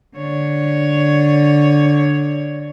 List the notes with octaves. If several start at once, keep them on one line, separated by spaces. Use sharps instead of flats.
D3 C#5